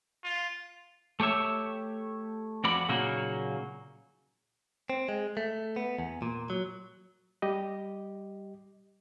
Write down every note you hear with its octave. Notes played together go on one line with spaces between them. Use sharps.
F4
A3 G4 C#5 E5
F2 F#4 D5 B5
A#2 C#3 F#3 A#3 D#4 F#4
C4
G#3
A3
B3
E2
A#2
F#3
G3 G4 D#5